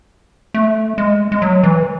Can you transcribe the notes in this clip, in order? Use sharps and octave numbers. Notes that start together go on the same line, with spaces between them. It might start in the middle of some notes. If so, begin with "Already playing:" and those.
A3
G#3
G#3
F#3
E3